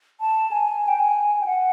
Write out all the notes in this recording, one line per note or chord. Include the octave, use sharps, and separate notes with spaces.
A5
G#5
G5
G#5
G5
F#5